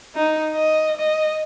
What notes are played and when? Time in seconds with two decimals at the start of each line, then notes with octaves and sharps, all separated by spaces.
0.15 D#4
0.53 D#5
0.97 D#5